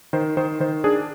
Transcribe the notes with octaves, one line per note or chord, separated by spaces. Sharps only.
D#3 C5
D#3 C5
D#3 C5
D4 G#4